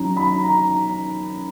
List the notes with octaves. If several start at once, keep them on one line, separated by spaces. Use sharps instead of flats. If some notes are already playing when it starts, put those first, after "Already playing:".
Already playing: F#2 D#3 F#3 A#5
B5
A#5
A#5